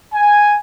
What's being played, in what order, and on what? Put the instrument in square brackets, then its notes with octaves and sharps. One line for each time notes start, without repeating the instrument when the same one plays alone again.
[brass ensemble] G#5